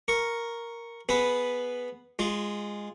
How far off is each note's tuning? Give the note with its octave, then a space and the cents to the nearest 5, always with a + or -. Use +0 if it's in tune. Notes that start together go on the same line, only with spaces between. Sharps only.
A#4 +0 C#6 +0
B3 +0 G#4 +15 B4 +0
G#3 -10 F4 +0